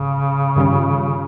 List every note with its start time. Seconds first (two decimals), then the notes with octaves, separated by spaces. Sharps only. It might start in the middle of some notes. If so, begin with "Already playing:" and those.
Already playing: G#1 G#2 C#3
0.56 G2 D#3 G3 C#4 F4